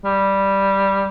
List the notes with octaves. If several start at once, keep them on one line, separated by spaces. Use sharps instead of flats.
G3